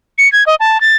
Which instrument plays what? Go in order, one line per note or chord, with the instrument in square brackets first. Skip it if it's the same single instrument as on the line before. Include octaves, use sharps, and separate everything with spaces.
[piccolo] C#7
G#6
D#5
A5
A6